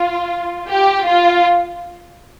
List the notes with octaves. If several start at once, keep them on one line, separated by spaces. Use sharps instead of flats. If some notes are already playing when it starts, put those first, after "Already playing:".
Already playing: F4
G4
F4